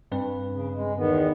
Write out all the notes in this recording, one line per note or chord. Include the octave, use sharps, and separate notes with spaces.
G2 C4 B4
C#3
G#3
E2 D#3 B3